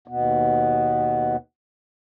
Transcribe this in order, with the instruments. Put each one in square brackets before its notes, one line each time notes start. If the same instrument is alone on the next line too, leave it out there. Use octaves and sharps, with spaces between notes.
[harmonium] D#2 B2 B3